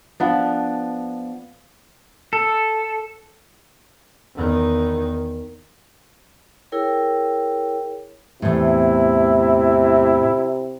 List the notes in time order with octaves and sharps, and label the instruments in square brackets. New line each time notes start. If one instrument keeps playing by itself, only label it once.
[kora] F3 B3 D4
[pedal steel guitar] A4
[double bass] E2 D#3
[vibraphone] E4 G#4 A#4 C#5 G5
[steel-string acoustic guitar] E2 A2 [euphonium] C3 [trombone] E4